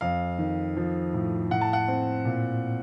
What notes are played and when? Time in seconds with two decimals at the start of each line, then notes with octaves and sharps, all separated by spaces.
0.01 F2 F5
0.38 D#3
0.77 F3
1.14 A2
1.51 A2 F#5
1.61 A5
1.73 F#5
1.88 C4
2.25 A#2